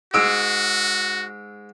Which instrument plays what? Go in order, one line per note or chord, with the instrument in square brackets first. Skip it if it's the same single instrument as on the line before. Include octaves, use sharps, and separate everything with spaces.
[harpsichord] G#2 G#3 [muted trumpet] F#4 [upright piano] E6 D7